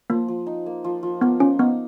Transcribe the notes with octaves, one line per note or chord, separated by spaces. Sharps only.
F3 A#3
F3
D#4
A#3
F3
F3
A#3 B3
F3 C#4
B3 D#4